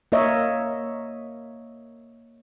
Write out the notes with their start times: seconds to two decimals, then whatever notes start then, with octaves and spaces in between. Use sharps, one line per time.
0.12 A#3 A#4 C#5 D#5 E5